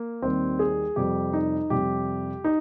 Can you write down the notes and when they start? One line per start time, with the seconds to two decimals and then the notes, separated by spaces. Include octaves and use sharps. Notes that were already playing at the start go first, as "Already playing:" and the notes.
Already playing: A#3
0.22 D#2 D#3 G3 C4
0.59 G#4
0.96 F2 C3 G3 G4
1.33 D#4
1.70 F2 C3 G3 G4
2.44 D#4